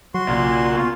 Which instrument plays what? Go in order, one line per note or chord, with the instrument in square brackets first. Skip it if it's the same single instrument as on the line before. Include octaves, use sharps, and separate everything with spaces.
[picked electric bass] F#3 [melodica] F#4 C6
[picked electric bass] B1 C#3 [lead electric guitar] A#2
[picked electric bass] B3 [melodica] F4